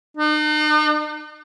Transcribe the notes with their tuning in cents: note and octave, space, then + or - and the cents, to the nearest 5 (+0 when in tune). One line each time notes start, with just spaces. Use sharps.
D#4 -45